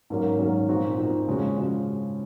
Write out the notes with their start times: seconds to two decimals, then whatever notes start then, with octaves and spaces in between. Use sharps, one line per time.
0.10 G#2 D#3 F#3 A#3 C#4
0.39 G#2 D#3 F#3 A#3 C#4
0.69 A#2 F3 C4 D#4 F#4
0.98 A#2 F3 C4 D#4 F#4
1.27 C#3 F3 G#3 C#4 F#4
1.57 C#3 F3 G#3 C#4 F#4